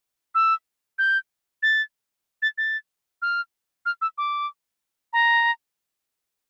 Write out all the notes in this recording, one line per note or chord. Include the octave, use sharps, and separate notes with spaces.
E6
G6
A6
A6
A6
F6
F6
E6
D6
A#5